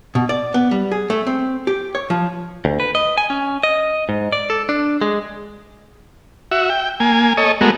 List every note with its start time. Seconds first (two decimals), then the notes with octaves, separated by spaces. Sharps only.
0.15 B2
0.29 D5
0.54 B3
0.71 G3
0.92 G#4
1.10 A3
1.27 C4
1.67 G4
1.95 C#5
2.10 F3
2.65 D2
2.80 B4
2.95 D#5
3.18 G#5
3.30 C#4
3.63 D#5
4.09 G#2
4.32 D5
4.50 A4
4.69 D4
5.01 G#3
6.51 F#4 E5
6.70 G5
7.00 A#3 G#5
7.37 A4 C#5 D#5
7.61 G#3 A3 B3 F#4 A#4